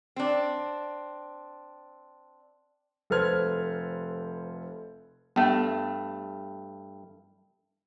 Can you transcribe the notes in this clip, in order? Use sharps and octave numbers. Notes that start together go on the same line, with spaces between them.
C4 D4
F1 A4 B4 C5 F6 G#6
G2 A3 B3